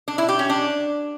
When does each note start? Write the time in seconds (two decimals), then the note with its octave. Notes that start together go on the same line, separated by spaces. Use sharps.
0.08 D4
0.18 E4
0.29 G4
0.39 C#4
0.50 D4